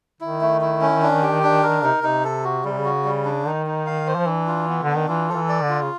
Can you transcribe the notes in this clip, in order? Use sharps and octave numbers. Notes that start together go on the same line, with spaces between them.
D#3 E4
A3
E4
C#4
D4
G4
D4
A#4
C3 D#4
C3 D#4
A4
F#4
C#3 G3
C3
C#3
F#4
G3
D4
D#3 D#4
D#4
F5
C5
F3
E3 D4
F4
B3
D3
D4
D#3
E3 F4
F3 A4
E3
D5
D3
F4
C#3